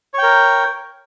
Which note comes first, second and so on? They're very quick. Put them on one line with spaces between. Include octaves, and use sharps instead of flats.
C#5 G5 A#4